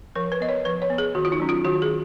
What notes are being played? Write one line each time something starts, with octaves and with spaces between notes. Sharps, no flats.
F3 A#4
B4
B3 D#5
C#5
F3 B4
C#5
B3
G#4
D#3 F#4
F4
D#4
F#3 C#4
F4
D#3 F#4
G#4